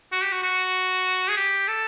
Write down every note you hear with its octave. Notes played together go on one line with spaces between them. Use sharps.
F#4
G4
F#4
F#4
G#4
G4
A4